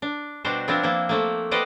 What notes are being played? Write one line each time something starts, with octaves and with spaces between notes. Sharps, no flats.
D4
B2 G3 D4 F#4 C5
F3 B3 C4 D4 E4 F4
F3 A#3 E4
F3 A3 A#3
G4 B4 C5 D5 D#5 F#5